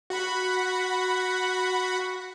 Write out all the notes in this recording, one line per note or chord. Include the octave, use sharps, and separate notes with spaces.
F#4 F#5 B5